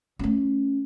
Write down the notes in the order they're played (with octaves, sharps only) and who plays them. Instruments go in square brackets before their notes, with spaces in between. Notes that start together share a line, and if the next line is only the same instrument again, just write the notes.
[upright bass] A3 C#4